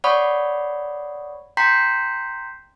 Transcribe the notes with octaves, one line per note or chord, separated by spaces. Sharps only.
C#5 D5 F#5 B5 C#6 D#6
G5 A#5 C6 G6 B6 C7